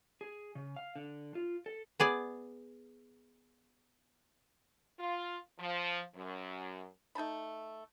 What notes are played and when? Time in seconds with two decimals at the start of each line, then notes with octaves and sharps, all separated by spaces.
0.21 G#4
0.55 C#3
0.76 F5
0.96 D3
1.35 F4
1.66 A4
2.00 B3 G#4 D5
4.99 F4
5.59 F3
6.15 F#2
7.15 A3 D#4 A5 B5